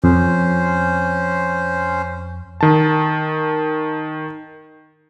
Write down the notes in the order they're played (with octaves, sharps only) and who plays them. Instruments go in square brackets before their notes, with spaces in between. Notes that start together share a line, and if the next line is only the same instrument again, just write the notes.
[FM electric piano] F2 [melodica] C#4 C5
[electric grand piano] D#3 A5